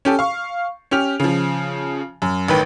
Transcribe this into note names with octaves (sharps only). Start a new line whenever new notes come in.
C#4 G4 A4
F5 C#6
C#4 G4 F6 F7
C#3 F3
F#2
A1 D#3 B4 G5